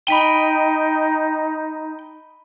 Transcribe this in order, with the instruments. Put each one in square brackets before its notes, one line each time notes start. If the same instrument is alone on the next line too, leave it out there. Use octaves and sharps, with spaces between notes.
[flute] D#4 [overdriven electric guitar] G5 [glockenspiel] B5 B6 D#7